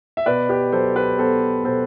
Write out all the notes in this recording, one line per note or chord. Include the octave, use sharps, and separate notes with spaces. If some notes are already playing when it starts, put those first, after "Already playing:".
E5
B2 B4 D5
G4 B4
F#3 A4 C5
G4 B4
B3 A4 C5
B2 A4 C5